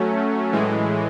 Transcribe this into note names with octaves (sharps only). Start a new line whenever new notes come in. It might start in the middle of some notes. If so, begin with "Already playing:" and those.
Already playing: F#3 A3 C#4
A2 E3 G#3